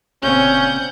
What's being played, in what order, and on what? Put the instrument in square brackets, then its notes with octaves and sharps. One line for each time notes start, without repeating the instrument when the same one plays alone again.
[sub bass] F1 [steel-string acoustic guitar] A#2 C#3 C4 [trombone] C#4 [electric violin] F#5 G6